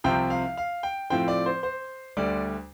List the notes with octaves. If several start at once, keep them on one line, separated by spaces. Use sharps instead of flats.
C2 C3 F3 C4 G5
F5
F5
G5
A2 F3 C4 G5
D5
C5
C5
D2 D3 G3 D5